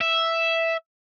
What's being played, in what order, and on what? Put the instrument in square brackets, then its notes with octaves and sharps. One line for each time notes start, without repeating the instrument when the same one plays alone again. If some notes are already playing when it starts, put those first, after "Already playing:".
[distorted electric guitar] E5